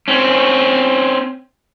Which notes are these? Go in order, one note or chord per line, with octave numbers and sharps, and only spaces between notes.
C4 C#4